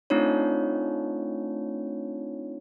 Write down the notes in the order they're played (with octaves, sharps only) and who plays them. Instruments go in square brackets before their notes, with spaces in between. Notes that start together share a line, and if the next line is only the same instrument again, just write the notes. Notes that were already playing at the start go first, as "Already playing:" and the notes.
[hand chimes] A3 C4 D4 D#4 F4 C#5